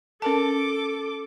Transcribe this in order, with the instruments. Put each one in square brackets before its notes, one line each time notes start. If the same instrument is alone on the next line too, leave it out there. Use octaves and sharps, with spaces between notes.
[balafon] C#4 A#4 A5 [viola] A4 D6